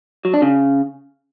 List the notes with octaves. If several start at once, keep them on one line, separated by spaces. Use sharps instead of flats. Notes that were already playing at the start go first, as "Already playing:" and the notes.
F#3
D4
C#3